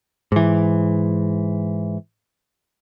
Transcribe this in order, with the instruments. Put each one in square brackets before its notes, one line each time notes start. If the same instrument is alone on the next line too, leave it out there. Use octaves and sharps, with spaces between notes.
[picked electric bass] G#2 E3